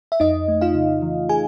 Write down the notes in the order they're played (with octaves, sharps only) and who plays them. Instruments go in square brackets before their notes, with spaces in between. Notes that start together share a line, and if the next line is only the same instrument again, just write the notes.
[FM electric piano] E5
F2 D#4 D#5
A3
F4 F5
C#3
E3
G#4 G#5